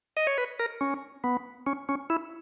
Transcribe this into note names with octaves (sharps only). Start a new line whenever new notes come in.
D#5
C#5
B4
A#4
C#4
B3
C#4
C#4
E4